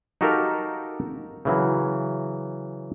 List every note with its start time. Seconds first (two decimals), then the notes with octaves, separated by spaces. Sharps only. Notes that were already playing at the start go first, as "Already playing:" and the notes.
0.21 D#4 F#4 G4 A4 A#4 F5
1.45 C#3 E3 F#3